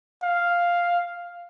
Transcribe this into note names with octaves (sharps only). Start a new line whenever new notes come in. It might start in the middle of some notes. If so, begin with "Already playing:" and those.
F5